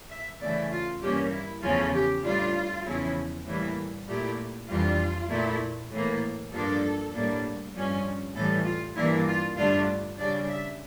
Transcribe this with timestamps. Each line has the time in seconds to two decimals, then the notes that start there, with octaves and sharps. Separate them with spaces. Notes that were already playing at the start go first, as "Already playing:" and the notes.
0.10 E5
0.40 C#3 E3 A3 E4 D5
0.71 F4
1.02 G2 E3 A#3 C#4 G4
1.32 E4
1.62 E2 C#3 F3 A3 C#4 F4
1.93 G4
2.23 A2 G3 D4 F4
2.85 E2 C#3 F3 C#4 E4
3.46 A2 E3 G3 A#3 E4
4.07 A#2 A3 E4 G4
4.68 F2 E3 G3 D4 F4
5.29 A#2 A3 E4
5.91 A2 E3 A#3
6.52 G2 F3 A#3 D4 A4
7.13 A2 G3 A#3 D4
7.74 G2 F3 C#4
8.35 A2 E3 G3 A4
8.65 F4
8.96 G2 E3 A#3 D4 E4
9.27 F4
9.57 G2 D3 A3 D4 F4
10.18 C#3 G3 D4 D5
10.49 E5